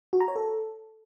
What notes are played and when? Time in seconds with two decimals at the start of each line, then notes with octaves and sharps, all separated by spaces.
0.13 F#4
0.20 A#5
0.28 C#5
0.36 A4